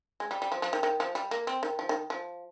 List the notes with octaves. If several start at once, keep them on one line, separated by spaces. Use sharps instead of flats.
G#3
G3
G3
F3
F3
D#3
D#3
F3
G3
A#3
C4
D#3
F3
D#3
F3